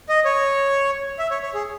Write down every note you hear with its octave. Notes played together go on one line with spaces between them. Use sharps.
D#5
C#5
E5
C#5
C#5
G#4